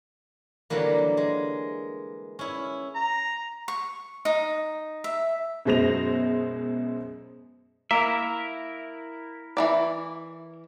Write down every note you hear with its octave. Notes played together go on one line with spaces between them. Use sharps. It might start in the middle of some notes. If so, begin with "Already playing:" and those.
D3 E3 F#3 G3 A#3
G#3
C#4 E4
A#5
C#6
D#4
E5
F#2 B2 G#3 C5 A#6 F7
A#3 E4 A#4 E5
E3 F#3 D5